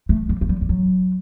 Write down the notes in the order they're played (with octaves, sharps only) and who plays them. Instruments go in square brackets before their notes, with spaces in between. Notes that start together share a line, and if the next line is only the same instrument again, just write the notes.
[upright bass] A3
G3
A3
G3
G3
F#3